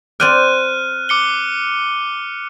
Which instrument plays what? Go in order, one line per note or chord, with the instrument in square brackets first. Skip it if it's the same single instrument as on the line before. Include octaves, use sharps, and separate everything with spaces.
[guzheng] C4 D5 G5 [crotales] F6 F#6 D#7
[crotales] D6 C#7 G7